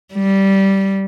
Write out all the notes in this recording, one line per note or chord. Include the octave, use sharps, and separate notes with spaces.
G3